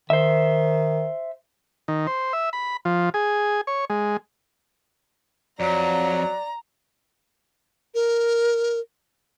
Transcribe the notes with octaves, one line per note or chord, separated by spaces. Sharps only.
D#3 C5 E5
D#3
C5
E5
B5
F3
G#4
C#5
G#3
F2 F#3 D5 A#5
A#4